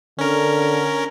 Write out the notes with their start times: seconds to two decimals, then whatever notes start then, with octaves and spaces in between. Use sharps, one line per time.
0.18 D3 C#4 A#4